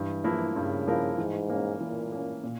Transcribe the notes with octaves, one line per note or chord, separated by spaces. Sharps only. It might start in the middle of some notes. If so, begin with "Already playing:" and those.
Already playing: G2 E3
F3 A#3 E4 A#4
G2 C#3
F3 A#3 E4 A#4
G#2 E3
A#3 C#4
A#2 E3
A#3 C#4
A#2